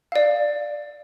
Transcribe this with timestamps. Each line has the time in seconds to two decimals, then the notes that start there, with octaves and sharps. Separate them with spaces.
0.12 D5 F5